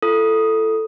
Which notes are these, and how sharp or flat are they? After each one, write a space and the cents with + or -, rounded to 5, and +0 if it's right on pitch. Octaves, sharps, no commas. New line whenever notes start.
F4 -45 A4 +0 D#6 +0